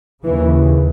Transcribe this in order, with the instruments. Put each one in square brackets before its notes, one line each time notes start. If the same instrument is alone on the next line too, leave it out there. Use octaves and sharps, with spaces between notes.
[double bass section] D#2 C#3 E3